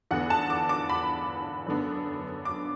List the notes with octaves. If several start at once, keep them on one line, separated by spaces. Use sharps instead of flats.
E2 D3 B3 F#5
A5
D6
D6
B5
F#2 D3 B3 D4
D6